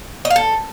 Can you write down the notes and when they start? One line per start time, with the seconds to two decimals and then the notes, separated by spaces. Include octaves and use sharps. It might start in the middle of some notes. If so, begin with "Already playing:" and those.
0.25 D#5
0.30 F5
0.36 A4